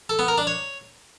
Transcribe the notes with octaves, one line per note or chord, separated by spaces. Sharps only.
A4
B3
A#4
D4
C#5